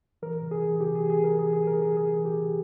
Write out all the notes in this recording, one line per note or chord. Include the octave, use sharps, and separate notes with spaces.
E3 A#4
C3
G#4
E3
G#4
C3 G4
G#4
E3
G#4
C3
A#4
E3 G#4
G#4
C3
A#4
E3 G#4
C3 G#4
E3
G4
C3